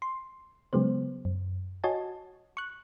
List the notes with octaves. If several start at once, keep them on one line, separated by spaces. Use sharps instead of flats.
C6
C#3 F#3 G#3 B3 C5
F#2
F#4 C#5 D#5 G#5 A5
C#6 F#6